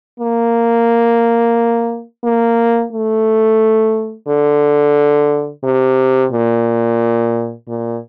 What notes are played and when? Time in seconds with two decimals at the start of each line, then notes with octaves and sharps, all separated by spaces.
0.20 A#3
2.24 A#3
2.93 A3
4.28 D3
5.64 C3
6.32 A#2
7.68 A#2